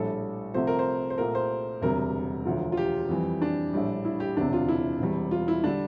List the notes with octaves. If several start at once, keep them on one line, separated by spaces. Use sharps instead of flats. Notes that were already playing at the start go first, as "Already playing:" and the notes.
Already playing: A#1 A2 G3 A4
C2 C3 F3 A3 C5
A#4
C5
C5
C2 A#2 A3 A#4
C5
E1 D2 C3 G3 A#4
E1 D2 D3 F3
F4
G4
F2 E3 G3
D4
A#1 A2 G3
E4
G4
E1 D2 C3 D4
F4
E4
E1 E2 C3 G3
F4
E4
D3 G3 D4